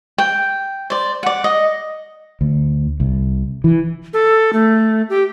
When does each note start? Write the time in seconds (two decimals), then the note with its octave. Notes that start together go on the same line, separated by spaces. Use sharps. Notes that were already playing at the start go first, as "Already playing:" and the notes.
0.18 G5
0.90 C5 D5
1.23 D5 F#5
1.44 D#5
2.41 D2
3.00 C2
3.64 E3
4.13 A4
4.53 A3
5.10 G4